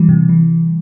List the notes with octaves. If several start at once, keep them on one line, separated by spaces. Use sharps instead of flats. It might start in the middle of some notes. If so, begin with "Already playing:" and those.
Already playing: E3 G3
C3
E3